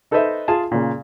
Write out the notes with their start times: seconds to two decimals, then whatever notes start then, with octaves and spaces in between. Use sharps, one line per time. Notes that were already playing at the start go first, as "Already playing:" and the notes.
0.11 D#4 A4 B4 C5 D#5 E5
0.48 F4 G#4 G#5 A5
0.72 A#2 C#3